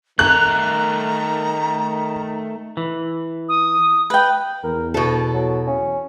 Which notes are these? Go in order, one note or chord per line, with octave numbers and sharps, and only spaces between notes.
D#3 A3 A#4 A#5 F#6
E3
D#6
B4 G5
E2 A#4
D2 B2 A4
F#3
C#4